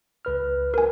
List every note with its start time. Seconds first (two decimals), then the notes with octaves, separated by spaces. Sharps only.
0.25 C#2 B4 F6
0.74 A#4 G#5